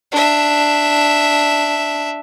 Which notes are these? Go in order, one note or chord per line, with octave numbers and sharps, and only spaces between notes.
D4 E5